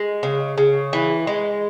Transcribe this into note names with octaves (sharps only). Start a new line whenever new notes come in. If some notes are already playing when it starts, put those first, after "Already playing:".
Already playing: G#3
C#3
C#3
E3
G#3